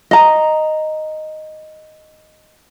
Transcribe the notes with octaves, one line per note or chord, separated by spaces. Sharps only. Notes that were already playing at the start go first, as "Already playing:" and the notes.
D#5 A#5